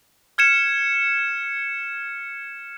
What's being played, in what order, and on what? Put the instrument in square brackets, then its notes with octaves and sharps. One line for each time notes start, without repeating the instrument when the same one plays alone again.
[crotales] F6 G#6 C#7 E7